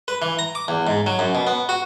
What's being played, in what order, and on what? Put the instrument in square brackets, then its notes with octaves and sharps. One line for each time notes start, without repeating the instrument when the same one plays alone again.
[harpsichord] B4
E3
A#5
D6
E2
G#2
F#3
F#2
B2
B3
F#4